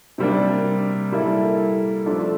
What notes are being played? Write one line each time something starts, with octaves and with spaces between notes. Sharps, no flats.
C3 G3 A#3 D4
G3 A#3 E4 A4
F3 A3 D4 A4